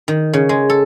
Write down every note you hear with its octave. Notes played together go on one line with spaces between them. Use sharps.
D#3
C#3
G#3
A4